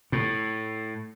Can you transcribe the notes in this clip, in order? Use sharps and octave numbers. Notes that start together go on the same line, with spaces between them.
A2